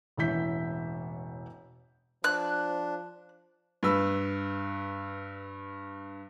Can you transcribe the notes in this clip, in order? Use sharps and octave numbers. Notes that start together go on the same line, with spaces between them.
E1 A1 E3 E5 G6 B6
F3 D4 F#6
G2 B4 E6